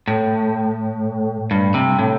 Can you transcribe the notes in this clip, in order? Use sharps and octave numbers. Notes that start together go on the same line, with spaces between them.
A2
G2
C3
A2